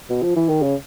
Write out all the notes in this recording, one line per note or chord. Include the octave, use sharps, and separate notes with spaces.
B2
F3
E3
D#3
C#3